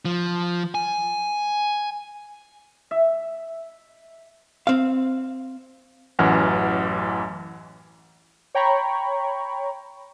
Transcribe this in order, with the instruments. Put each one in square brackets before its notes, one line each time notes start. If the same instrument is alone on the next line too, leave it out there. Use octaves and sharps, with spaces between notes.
[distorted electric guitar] F3
G#5
[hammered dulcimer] E5
[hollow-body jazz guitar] C4 F5
[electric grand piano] A1 F#2 E3 F#5 F6
[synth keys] C#5 G5 A#5 B5 C#6